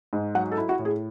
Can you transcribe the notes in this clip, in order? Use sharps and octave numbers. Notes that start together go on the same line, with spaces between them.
G#2
F#3 F#5
A4
E4
F#4
A2
G#4